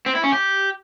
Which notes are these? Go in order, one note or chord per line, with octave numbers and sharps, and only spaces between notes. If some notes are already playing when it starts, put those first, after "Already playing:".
C4
E4
C#4
G4